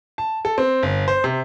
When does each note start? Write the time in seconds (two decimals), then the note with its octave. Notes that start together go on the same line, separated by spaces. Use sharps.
0.18 A5
0.45 A4
0.58 C4
0.83 G1
1.08 C5
1.24 C3